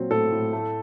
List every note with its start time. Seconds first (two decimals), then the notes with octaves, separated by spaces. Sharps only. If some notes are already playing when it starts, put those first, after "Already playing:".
Already playing: A#2 F#3 C4
0.10 A2 A4
0.32 A2
0.53 A3